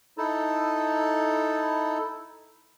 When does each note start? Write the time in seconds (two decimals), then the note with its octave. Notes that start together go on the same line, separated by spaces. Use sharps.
0.18 D#4 E4 A4